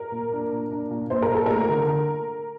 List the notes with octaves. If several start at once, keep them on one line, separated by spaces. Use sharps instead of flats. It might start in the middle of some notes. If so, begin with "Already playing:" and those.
Already playing: A#4
A#2
D4
A#2
D4
A#2
A#2 C5
A#4
A#2
A4
A3 A#4
D3